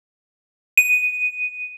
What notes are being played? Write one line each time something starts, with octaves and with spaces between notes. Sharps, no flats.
D#7